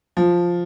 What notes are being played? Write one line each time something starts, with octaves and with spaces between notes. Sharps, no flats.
F3